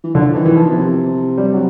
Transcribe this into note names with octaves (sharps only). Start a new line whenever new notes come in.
E3
D3 F3
D#3 E3
E3
F3
B2
C3
G3
F#3